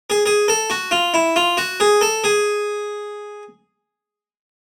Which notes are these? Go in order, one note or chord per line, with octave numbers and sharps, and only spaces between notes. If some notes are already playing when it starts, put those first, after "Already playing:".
G#4
G#4
A4
F#4
F4
E4
F4
F#4
G#4
A4
G#4